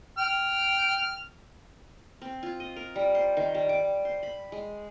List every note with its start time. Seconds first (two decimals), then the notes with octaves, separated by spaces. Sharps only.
0.18 G5 F6
2.21 C4
2.43 F4
2.60 D#5
2.76 A#4
2.96 G3
3.15 C5
3.37 D#3
3.55 G3
3.69 D6
4.05 C5
4.23 B5
4.52 G#3